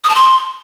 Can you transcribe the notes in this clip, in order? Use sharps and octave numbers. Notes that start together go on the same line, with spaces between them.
D#6
A5
C6